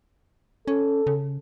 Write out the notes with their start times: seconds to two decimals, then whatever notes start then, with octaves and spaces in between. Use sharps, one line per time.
0.68 C#4 A4
1.07 C#3